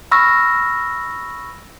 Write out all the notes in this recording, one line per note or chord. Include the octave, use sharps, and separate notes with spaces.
B5 C#6 E6 F6 A#6